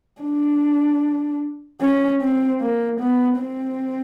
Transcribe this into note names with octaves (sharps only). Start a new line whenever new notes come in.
D4
C#4
C4
A#3
B3
C4